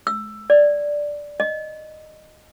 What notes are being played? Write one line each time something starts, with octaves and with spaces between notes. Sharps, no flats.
E6
D5
D#5